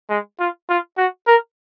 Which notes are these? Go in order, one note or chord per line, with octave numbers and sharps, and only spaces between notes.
G#3
F4
F4
F#4
A#4